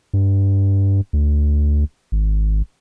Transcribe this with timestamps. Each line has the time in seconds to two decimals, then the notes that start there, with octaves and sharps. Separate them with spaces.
0.14 G2
1.13 D2
2.12 G#1